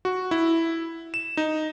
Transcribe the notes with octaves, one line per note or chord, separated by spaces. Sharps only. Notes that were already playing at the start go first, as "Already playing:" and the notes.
F#4
E4
E7
D#4